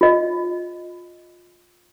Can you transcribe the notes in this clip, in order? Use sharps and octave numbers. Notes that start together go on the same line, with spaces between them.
F4 D#5